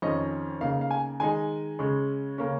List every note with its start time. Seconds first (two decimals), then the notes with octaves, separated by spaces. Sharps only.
0.02 F2 D#3 C#4 D#5
0.60 C#3 A#3 D#4 F5
0.81 F5
0.91 G#5
1.20 D#3 G#3 D#4 G#5
1.79 C#3 G#3 C#4
2.38 C#3 A#3 C#4